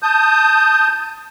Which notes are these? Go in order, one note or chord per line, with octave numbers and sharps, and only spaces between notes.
A5 D#6 G6